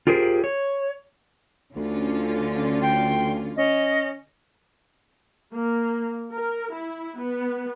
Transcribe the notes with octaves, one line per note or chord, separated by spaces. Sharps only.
F4 G4 G#4 A#4 C5
C#5
D2 D3 C#4 F4
G5 C6
C#4 D#5
A#3
A#4
E4
B3